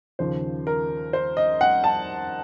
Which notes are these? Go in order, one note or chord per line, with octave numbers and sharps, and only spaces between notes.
D#2 C#3 F3 C5
A#4
C5
D#5
F#5
A5